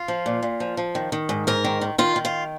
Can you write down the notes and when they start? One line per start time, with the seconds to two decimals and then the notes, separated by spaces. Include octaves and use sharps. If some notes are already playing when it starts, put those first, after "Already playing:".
Already playing: F4
0.08 F3
0.26 A#2
0.43 A#2
0.60 F3
0.77 F3
0.95 D#3
1.12 D#3
1.29 G#2
1.47 G#2 A#4
1.64 D#3
1.81 D#3
1.98 D#3 F4
2.16 D#3
2.25 F4